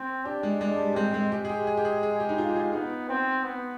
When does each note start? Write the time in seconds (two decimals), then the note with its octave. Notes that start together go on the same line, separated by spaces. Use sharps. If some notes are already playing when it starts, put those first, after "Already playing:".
Already playing: C4
0.25 D4 G4
0.43 G#3
0.61 G#3 D4
0.78 G3
0.96 G#3 C4
1.14 G#3
1.32 G#3 G4
1.45 G#4
1.49 G4
1.67 G#4
1.77 G4
1.85 G#4
2.03 G#4
2.20 G4
2.29 D#4
2.38 F4
2.49 G4
2.56 F4
2.73 B3 D#4
3.09 C4
3.44 B3